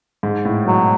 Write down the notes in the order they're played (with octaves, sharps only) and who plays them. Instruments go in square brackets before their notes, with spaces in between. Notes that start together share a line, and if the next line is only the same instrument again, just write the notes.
[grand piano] G#2
A2
[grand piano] B2 [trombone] F#3